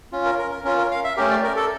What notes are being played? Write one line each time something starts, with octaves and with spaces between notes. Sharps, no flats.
C#4 F4
A#4
A#4
A#4
C#4 F4 A#4
A#4
F5
E5
A3 C#4 G4 A#4
D5
A#4
A4